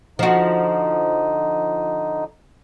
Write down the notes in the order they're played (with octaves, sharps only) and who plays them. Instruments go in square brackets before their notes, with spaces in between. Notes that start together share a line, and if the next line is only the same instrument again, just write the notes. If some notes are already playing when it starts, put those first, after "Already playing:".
[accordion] D3 D#4 [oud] F3 F#4